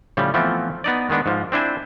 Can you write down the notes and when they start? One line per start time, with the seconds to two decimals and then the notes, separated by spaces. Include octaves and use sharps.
0.17 A2 C#3 F3 G3
0.34 E3 F3 A3 B3 C4
0.84 B3 D#4 D5
1.10 D#3 G#3 B3 D4
1.26 G#2 F3
1.52 C4 D4 E4 C5 G#5